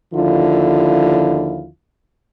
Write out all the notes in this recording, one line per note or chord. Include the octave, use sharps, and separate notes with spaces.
D#2 D3 F3 E4 F4